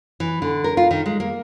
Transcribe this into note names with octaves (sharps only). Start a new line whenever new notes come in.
E3
D3
A#4
F4
D#3
G#3
A#3